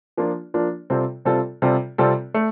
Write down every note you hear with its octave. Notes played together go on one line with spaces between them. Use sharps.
F3 A#3 D4 F4
F3 A#3 D4 F4
C3 G3 C4 F4 A4
C3 G3 C4 F4 A4
C3 G3 C4 F4 A4
C3 G3 C4 F4 A4
A3